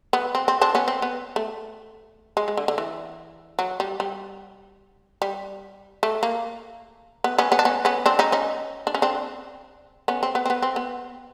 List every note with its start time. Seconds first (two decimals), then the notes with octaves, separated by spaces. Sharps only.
0.13 B3
0.35 C4
0.48 C4
0.61 C4 D4
0.75 B3 C#4
0.88 C4
1.02 B3
1.36 A3
2.37 G#3
2.48 G#3
2.57 D3
2.68 D3
2.78 E3
3.59 F#3
3.80 G3
4.00 G3
5.22 G3
6.03 A3
6.23 A#3
7.24 B3
7.38 B3 C#4
7.52 B3 C#4
7.59 D4
7.65 B3 C#4
7.85 B3 C#4
8.06 C4 D4
8.19 C#4 D#4
8.32 C#4 D#4
8.87 D4
8.95 C#4
9.02 C4 D4
10.08 B3 C#4
10.23 C4
10.35 B3
10.45 C4
10.50 B3
10.62 C4
10.76 B3